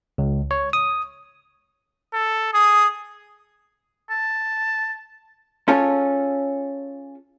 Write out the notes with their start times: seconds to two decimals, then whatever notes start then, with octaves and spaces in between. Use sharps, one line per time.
0.18 C#2
0.51 C#5
0.73 D#6
2.14 A4
2.54 G#4 D#6
4.10 A5
5.68 C#4 F4 G#4 A4